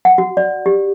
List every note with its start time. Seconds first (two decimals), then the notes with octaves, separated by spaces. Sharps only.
0.05 F#5
0.18 F#4
0.37 D5
0.66 G4